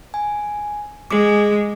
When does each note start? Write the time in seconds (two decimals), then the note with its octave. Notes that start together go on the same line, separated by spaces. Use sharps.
0.14 G#5
1.11 G#3 G#4 D6